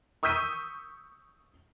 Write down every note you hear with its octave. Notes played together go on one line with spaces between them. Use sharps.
C#6 D#6 E6 G6 B6 D#7